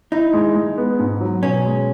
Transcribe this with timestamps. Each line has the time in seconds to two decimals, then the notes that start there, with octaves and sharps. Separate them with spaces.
0.12 D#4 E4
0.34 G#3
0.55 G#3
0.78 B3
0.99 G#2
1.21 F#3
1.43 B2 C#4
1.66 G#3